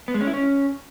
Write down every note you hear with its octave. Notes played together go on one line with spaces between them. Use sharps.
B3
G#3
C#4
E4
C#4